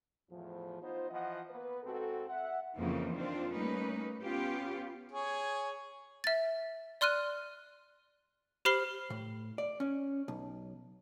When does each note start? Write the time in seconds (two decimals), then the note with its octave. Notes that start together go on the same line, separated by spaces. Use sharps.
0.30 E2 A2 F3
0.81 B3 D#4 F4 C5
1.10 E3 F3 D#5 F#5
1.50 A#3 B3 B4
1.83 G#2 C4 F#4 A4
2.28 E5 F#5
2.76 F2 C#3 E3 A#3 D#4
3.14 D#3 C4 D4 F4
3.51 G3 A3 A#3 C#4 D#4 B4
4.22 B3 C#4 F4 G4
5.12 G#4 C#5
6.24 E5 A6
7.01 D5 C6 F6 F#6 D#7
8.65 G4 C5 B5 F6 C7 G7
9.10 A2
9.58 D5
9.80 C#4
10.28 B1